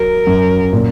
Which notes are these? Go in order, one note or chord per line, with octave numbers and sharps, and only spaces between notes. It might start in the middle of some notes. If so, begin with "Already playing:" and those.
Already playing: F#3 A#4
F#2
A#2